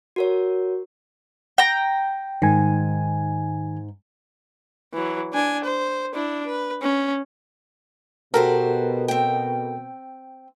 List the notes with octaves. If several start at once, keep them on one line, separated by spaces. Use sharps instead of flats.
F#4 A#4 C#5
G5 A#5
G#2 D#3 G#5
E3 F#3
D4 G#5
C5
D4 E4
B4
C#4
B2 F#4 G4 A4 A#4 C5
C4 G5